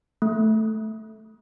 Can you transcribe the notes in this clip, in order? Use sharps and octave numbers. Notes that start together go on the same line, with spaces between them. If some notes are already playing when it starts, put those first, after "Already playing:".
A3